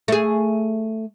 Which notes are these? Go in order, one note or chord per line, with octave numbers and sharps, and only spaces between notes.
A3 G#4